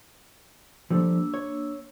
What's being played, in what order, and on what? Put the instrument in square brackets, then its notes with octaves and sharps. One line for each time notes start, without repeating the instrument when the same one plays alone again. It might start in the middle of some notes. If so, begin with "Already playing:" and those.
[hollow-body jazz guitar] F3 G3 A3 [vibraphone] A#3 D4 E6
[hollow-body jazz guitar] C#5